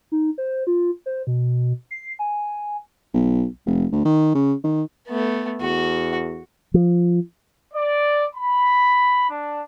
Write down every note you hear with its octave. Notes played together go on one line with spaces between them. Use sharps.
D#4
C5
F4
C5
B2
C7
G#5
B1
F1
D2
D#3
C#3
D#3
A3 B3
E2 F#4
F3
D5
B5
D4